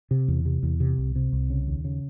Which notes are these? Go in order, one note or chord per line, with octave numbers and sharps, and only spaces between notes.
C3
E2
C3
E2
C3
C2
C3
C2
C#3
D#2
C#3